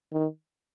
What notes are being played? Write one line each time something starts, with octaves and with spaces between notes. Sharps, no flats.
D#3